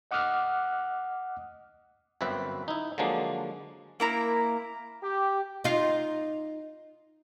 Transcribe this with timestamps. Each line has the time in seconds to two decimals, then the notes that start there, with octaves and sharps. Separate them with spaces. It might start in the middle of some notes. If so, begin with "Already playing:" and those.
0.11 D#5 F#5 D6 D#6 F6 F#6
2.21 G1 F#2 C4 B4 E5
2.68 D#4 E4
2.98 D3 F3 F#3 G#3 A#3 D4
4.00 A#3 E4 A#5
5.03 G4
5.64 D#4 F4